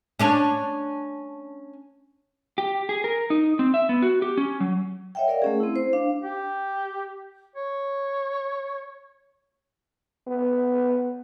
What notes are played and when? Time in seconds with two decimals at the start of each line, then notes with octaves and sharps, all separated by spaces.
0.19 C#4 D4 C#5
2.58 G4
2.89 G#4
3.04 A#4
3.30 D#4
3.59 C4
3.74 E5
3.89 B3
4.02 F#4
4.22 G4
4.37 C#4
4.60 F#3
5.15 C#5 D#5 E5 F#5 G5
5.28 A#4 D5 F5
5.42 A3 C#4 G#4
5.60 C4 E4
5.76 C5
5.93 D4 F5
6.22 G4
7.56 C#5
10.27 B3